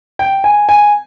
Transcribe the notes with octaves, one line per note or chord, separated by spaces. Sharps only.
G5
G#5
G#5